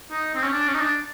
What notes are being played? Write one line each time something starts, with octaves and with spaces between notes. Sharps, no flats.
D#4
C4
C#4
D4
C#4
D#4
D4